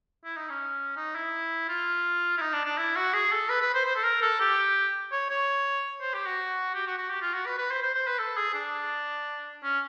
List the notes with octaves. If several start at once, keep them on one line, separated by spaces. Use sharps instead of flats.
E4
D#4
C#4
D#4
E4
F4
E4
D#4
D4
D4
E4
F#4
G#4
A4
B4
B4
C5
C5
A4
A#4
A4
G4
C#5
C#5
C5
G4
F#4
G4
F#4
F#4
G4
F4
F#4
B4
B4
C5
C5
C5
B4
A4
G#4
D4
C#4